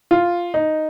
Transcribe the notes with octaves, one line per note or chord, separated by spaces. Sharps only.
F4
D#4